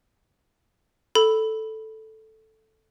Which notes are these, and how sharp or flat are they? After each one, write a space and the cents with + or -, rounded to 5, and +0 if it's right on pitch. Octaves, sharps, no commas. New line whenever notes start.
A4 +0 B5 +0